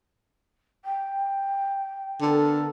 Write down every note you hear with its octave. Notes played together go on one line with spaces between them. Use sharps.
G5
D3 B3 A4 A#4